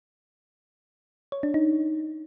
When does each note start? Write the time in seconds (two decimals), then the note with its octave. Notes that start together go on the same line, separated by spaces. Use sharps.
1.32 C#5
1.43 D4
1.54 D#4